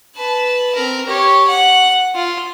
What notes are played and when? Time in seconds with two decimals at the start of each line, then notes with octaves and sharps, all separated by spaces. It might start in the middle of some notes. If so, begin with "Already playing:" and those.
0.16 B4 A5
0.75 C4 A#4
1.06 G4 C#5
1.47 F#5
2.15 F4